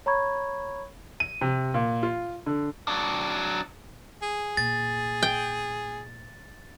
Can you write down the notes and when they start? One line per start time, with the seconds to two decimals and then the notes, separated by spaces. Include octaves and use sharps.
0.06 C#5 A#5 B5 C#6 G#6
1.20 D#7
1.41 C3
1.74 A#2
2.03 F4
2.46 D3
2.88 F#3 D4
4.22 G#4
4.57 A#2 A6
5.23 G5